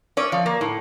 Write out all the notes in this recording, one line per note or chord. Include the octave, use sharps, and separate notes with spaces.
C#4 D5
F3
A#3
A2